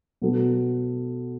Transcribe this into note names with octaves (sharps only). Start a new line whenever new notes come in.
B2 F#3 B3 F#4 A4